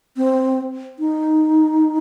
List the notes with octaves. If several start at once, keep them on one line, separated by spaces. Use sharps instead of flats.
C4
D#4